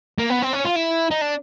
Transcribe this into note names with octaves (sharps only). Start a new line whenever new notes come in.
A#3
B3
C4
C#4
F4
E4
D#4
D4